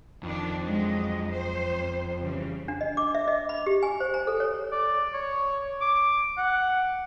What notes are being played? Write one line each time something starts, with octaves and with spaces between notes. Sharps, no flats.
F2 D#3 D4
F#3 G#3 D#5
C5
C#3 E3 G3
D4
D#5
D6
E5
D#5
B5
G4
G#5
C5
A#5
A4
C#5
D5
C#5
D6
F#5